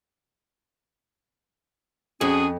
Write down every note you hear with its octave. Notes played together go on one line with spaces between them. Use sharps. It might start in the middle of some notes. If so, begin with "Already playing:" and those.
F2 C#4 D4 F#4 G#4